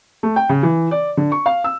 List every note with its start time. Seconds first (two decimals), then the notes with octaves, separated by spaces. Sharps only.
0.23 A3
0.36 G5
0.49 C#3
0.63 E3
0.91 D5
1.17 D3
1.32 C#6
1.46 F5
1.64 E6